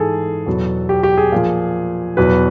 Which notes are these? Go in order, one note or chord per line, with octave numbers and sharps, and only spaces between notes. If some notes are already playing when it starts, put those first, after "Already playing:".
Already playing: G#2 E3 G#4 A4
E2 B2 F#3
G4
G4
G#4
A#2 F3
E2 B2 F#3 B4